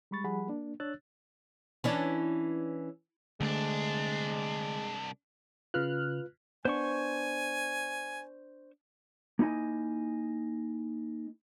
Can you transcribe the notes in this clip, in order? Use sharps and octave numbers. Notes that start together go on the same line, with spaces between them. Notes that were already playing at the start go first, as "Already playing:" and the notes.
G3 G#3 B5 C#6 A6
F3 G3 G#4 F#5 B5
A#3 D4
D4 C#5 E6 F#6 A6
E3 C#4 D4
C2 D3 G#3 A3 D4
C#3 F4 B4 F6 F#6
B3 D4 C5 G#5 C#6
A#3 D#4 E4 D#5 G#5